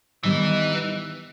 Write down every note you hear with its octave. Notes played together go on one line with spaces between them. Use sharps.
D#3 E3 G3 B3 D#4